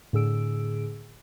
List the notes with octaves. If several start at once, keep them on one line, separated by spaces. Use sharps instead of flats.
A2 D3 G#4 E6 D7